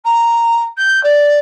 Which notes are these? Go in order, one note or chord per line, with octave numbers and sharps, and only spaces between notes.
A#5
G6
D5